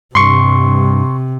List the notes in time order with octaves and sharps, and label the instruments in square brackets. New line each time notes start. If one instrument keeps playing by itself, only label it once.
[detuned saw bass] G2 [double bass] C3 [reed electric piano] C6 C#6